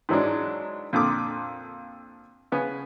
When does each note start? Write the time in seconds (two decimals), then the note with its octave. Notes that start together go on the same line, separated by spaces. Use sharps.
0.09 G#2 E3 F#3 G#3 D4
0.93 F2 A#2 D3 D6 D#6
2.52 C#3 B3 G#5